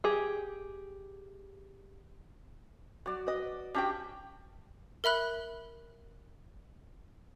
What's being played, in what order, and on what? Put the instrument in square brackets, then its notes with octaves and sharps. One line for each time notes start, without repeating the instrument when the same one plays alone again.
[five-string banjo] G4 G#4
[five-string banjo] F#3 [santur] F#4 D5
[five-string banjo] B4 D#5
[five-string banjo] C#4 F#4 G5 [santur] D4 G4
[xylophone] A#4 E5 B5 F#6